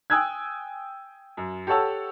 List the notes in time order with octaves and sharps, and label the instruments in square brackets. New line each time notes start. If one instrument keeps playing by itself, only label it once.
[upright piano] G5 G#5 D#6 E6 F#6 G#6
F#2
G4 A4 C#5 F#5 A5 E6